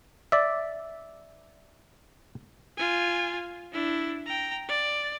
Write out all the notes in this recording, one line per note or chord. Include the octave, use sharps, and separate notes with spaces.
D5 E5
F4 G#5
D4 E4
G5 A#5
D5